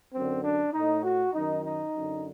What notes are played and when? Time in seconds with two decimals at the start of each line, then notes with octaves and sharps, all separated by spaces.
0.13 F#2 D3 C4
0.43 D4
0.73 A2 D#4
1.03 F#4
1.33 F#2 D#3 D#4
1.64 D#4
1.94 F#2 D3